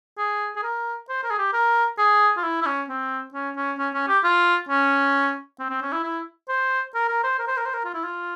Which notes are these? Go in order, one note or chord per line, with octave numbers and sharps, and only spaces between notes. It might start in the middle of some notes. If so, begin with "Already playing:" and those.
G#4
G#4
A#4
C5
A#4
G#4
G4
A#4
G#4
F4
E4
E4
C#4
C4
C#4
C#4
C#4
C#4
G4
F4
C#4
C4
C4
C#4
E4
E4
C5
A#4
A#4
C5
A#4
C5
A#4
C5
A#4
F4
E4
F4